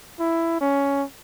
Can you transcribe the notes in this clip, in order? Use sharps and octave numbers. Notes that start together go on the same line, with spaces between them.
E4
C#4